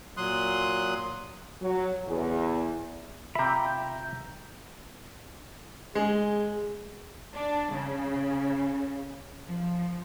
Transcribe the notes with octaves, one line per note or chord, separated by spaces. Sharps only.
A#2 F#3 C6 D#6 F#6
F#3
E2
C3 F4 E5 G5 A#5 B5
G#3 G#4
D4
C#3
F3